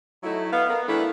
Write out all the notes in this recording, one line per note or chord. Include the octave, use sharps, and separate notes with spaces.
F#3 A3 D#4 E4
B3 F5
B3 A#4
E3 A3 B3 D4 E4